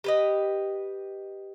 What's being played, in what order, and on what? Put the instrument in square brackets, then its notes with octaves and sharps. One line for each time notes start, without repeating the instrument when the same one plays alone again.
[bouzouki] G4 B4 D#5